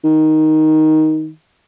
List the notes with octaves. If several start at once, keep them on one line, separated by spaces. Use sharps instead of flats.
D#3